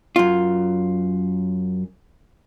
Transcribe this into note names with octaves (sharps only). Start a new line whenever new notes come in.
F#2 F4